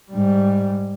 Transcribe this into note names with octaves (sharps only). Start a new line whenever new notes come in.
G#2 G3